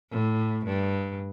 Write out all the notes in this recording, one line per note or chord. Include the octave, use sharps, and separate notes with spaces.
A2
G2